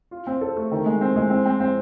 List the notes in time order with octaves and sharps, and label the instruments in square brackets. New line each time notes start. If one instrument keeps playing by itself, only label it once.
[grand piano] F4
C4
A4
A3
D#3
G#3
C4
G#3
C4
C4
C4